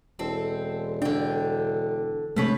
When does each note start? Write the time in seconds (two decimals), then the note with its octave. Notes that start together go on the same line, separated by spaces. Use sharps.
0.19 E1 C4 A4
1.02 D3 D4 G5
2.37 A#1 C3 F3 G#3 A3 B4 C#5